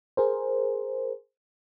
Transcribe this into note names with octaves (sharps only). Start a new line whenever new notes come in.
G#4 A#4 C5